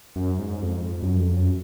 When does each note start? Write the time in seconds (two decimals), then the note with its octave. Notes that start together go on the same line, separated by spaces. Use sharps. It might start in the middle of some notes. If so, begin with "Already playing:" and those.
0.16 F#2
0.39 G#2
0.62 F2
1.03 F#2
1.20 F2
1.37 F#2